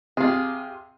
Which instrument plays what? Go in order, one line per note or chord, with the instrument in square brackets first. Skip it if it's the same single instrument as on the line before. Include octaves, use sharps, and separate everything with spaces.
[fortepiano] C3 [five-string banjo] F4 G#4